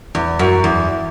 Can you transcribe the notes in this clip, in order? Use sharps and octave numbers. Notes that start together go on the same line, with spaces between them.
E2
F#2
E2